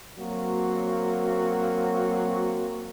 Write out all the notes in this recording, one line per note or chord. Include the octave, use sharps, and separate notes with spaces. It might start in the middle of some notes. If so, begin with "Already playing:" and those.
F#3 A#3 C4 F#4